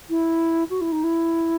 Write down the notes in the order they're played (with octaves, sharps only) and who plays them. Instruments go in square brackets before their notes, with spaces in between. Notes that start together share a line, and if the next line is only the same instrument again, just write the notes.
[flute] E4
F#4
E4
D#4
E4